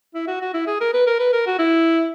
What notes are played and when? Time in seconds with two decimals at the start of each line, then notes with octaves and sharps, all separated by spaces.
0.14 E4
0.27 F#4
0.41 F#4
0.54 E4
0.67 G#4
0.81 A#4
0.93 B4
1.07 A#4
1.20 B4
1.33 A#4
1.47 F#4
1.59 E4